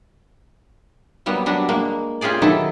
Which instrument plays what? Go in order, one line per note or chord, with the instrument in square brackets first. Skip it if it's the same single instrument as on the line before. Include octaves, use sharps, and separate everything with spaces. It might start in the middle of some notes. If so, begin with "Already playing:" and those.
[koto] F#3 G3 A#3 B3
F#3 G3 D4
G#3 A#3
C#4 F4 G4 G#4 D5
D#3 F#3 D#4 E4 A4